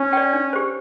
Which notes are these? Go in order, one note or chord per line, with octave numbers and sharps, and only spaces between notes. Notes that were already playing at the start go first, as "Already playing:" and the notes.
Already playing: C#4
D5 G5
D4
G4 C5